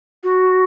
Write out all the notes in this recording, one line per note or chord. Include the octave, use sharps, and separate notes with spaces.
F#4